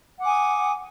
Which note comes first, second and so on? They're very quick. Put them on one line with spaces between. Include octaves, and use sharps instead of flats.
F#5 D6 G#5 D#6